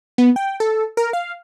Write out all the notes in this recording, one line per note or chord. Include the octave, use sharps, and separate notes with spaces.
B3
G5
A4
A#4
F5